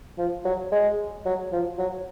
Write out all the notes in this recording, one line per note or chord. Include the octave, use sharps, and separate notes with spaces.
F3
F#3
G#3
F#3
F3
F#3